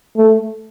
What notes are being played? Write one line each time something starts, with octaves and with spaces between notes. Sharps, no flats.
A3